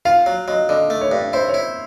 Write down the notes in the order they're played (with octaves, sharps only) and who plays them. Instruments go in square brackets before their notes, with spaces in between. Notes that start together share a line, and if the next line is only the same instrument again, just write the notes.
[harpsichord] F4 [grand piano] F5
[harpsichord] F#3
[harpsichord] F#3 [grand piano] D#5
[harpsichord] D3 [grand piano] D#5
[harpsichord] A3
[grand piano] C#5
[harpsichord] G2
[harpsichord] E4 [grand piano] C5
[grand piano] C#5
[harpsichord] E4